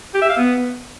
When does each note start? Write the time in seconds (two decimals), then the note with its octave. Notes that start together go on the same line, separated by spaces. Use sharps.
0.14 G4
0.22 E5
0.29 F5
0.37 B3